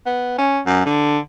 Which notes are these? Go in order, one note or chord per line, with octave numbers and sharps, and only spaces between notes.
B3
C#4
F#2
D3